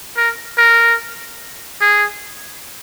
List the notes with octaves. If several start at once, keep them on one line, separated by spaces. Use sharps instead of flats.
A#4
A#4
G#4